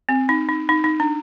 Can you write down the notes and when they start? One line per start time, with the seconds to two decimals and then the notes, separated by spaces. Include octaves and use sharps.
0.09 C4
0.29 D#4
0.49 D#4
0.69 D#4
0.84 D#4
1.00 D4